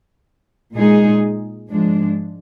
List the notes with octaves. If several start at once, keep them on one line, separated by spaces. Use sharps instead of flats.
A#2 G#3 D#4 G#4
G#2 F3 G#3 D4